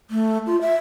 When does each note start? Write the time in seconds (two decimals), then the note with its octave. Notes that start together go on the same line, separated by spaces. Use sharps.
0.10 A3
0.46 F4
0.61 E5